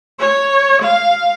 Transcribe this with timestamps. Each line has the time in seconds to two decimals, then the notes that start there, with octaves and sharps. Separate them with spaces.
0.20 C#5
0.83 F5